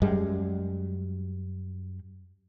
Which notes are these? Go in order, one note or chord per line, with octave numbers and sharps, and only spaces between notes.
F#2 G3 G#3